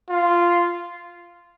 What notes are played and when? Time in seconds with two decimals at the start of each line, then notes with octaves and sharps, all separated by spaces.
0.10 F4